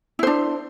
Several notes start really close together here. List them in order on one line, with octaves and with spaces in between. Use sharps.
E4 C5 D4